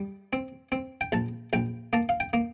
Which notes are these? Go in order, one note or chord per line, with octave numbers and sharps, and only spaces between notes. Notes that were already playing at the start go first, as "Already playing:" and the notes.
Already playing: G3
C4
C4
G5
A#1 A5
A#1 G5
A#3 A5
F5
G5
A#3